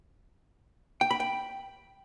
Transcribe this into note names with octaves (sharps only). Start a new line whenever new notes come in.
G5
B5
G5